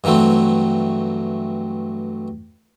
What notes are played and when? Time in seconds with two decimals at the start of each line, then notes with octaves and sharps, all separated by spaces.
0.04 G2 E3 F#3 A3 C4